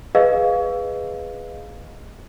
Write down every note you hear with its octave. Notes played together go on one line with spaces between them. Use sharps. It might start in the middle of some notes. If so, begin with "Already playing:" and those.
G#4 B4 D#5 F5